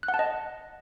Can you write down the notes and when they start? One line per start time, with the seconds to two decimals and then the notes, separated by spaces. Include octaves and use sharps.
0.03 F#6
0.08 F#5
0.14 A5
0.19 D#5